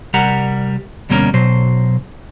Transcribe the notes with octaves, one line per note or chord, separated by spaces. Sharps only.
C2 G3 G4 A#4 F#5 A#5
D2 B2 G3 A#3 C#4 A#4
B1 B2 F#3 C5